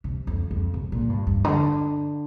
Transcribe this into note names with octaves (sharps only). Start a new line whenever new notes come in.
C3
F2
F2
C3
A#2
G2
G2
D3